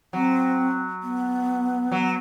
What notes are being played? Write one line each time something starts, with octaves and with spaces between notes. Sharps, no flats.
F#3 C4
B3
F#3